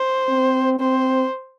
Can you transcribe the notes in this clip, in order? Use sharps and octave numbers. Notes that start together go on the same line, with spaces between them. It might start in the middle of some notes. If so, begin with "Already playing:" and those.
Already playing: C5
C4
C4 C5